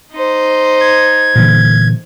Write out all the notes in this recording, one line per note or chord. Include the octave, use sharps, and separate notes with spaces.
D#4 C5
G#6
A#2 D3 E3